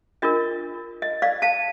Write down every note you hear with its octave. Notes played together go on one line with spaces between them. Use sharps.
D4 F4 A#4 D#5
D#5
D5 F5
F5 A5